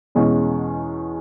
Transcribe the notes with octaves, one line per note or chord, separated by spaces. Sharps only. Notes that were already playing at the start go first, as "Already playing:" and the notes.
E2 B2 G#3 C#4